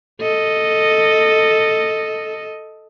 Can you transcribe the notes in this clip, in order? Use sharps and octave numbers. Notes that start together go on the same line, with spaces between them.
A4 D#5